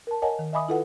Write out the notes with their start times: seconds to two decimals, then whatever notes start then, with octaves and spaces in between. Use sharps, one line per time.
0.07 A#4 A5
0.22 A#4 C#5 D#5 F#5 G#5 A5
0.39 D#3
0.53 D#5 E5 G#5 B5 D6 D#6
0.68 E4 F4 A4 B4 F#5